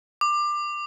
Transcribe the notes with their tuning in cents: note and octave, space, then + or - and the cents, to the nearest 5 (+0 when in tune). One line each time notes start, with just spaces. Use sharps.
D6 +20